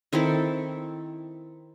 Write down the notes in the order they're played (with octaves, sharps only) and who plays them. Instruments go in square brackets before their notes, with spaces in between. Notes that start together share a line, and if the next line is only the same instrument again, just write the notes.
[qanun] D#3 C4 E4 A4